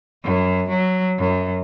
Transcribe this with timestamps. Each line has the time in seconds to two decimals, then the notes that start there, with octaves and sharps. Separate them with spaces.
0.24 F#2
0.69 F#3
1.19 F#2